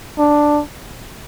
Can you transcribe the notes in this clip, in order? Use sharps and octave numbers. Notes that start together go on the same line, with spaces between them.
D4